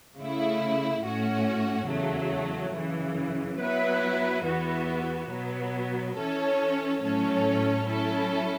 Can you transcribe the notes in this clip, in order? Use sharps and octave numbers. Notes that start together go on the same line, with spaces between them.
C#3 A3 E4
A2 A3 C#4 F#4
E2 C#3 F#3 A3
F#2 C#3 E3
F#3 B3 E4 B4
E2 E3 B3 F#4
B2 F#3 B3
E3 C#4 A4 C#5
A2 F#3 C#4 A4 C#5
F#3 C#4 E4 A4